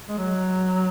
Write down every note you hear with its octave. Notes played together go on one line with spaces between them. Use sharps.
G#3
F#3